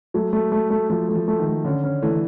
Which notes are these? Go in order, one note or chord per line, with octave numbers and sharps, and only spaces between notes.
F#3 A3
A3
A3
A3
F3 A3
A3
F3
A3
D#3
A3
D3 C#4
C#4
E3 A3